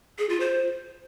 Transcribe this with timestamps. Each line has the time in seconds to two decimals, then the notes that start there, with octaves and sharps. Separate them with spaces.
0.19 G#4
0.29 F4
0.40 C5